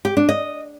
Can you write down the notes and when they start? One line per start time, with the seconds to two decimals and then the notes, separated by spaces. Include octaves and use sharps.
0.05 G4
0.17 D4
0.29 D#5